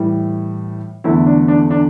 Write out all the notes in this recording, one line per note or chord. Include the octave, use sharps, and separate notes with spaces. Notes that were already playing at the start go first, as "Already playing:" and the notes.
Already playing: A2 E3 G3
E2 D3 A3 E4
D4
D4
D4